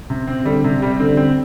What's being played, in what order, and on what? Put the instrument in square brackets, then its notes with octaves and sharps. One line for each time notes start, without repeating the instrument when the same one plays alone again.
[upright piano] C3
C4
[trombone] D3 [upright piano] G3
[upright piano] C3
G3
[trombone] D3 [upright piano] C4
[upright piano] C4